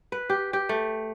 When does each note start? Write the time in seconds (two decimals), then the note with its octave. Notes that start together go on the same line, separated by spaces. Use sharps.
0.12 B4
0.30 G4
0.53 G4
0.69 A3